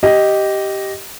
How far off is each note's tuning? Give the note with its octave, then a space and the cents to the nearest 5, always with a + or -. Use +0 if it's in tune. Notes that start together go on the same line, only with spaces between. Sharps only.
G4 -10 D#5 +0